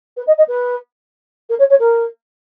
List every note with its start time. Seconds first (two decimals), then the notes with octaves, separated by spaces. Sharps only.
0.17 B4
0.27 D#5
0.38 D#5
0.48 B4
1.49 A#4
1.59 C#5
1.70 C#5
1.79 A#4